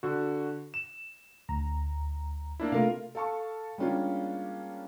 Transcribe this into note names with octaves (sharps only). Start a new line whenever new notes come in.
D3 F#4
E7
D2 A#5
A#3 D4 E4
C3 A3 F4 A#4 F5
A4 F5 A5 C#6
G3 G#3 A#3 C#4 D4 F4